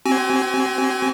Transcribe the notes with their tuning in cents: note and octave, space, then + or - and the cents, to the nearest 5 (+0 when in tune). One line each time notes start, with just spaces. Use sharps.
C4 +0 F#4 +45 G#5 +0